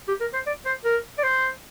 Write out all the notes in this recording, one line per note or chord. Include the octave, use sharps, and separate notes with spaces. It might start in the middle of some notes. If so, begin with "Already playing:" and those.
G4
A#4
C5
D5
C5
A#4
D5
C5